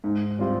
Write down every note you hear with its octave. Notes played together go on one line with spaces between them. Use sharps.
G#2
G3 C4 F4